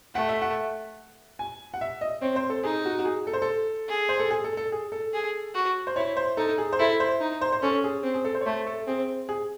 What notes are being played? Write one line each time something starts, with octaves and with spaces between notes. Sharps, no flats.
A3 F#5
E5
F#5
G#5
F#5
E5
D#5
C4 C#5
C5
A4
D#4 G#4
F#4
F#4
G#4
A4
C5
A4
G#4
C5
A4
G#4
A4
A4
G#4
A4
G#4
F#4
C5
E4 C#5
C5
D#4 A4
G#4
C5
E4 A4
C5
D#4
C5
C5
C#4 A4
G#4
C4
G#4
A4
C5
C#5
A3 C5
A4
C4 G#4
G#4